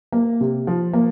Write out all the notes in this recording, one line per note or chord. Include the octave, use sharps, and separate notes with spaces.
A#3
C3
F3
A#3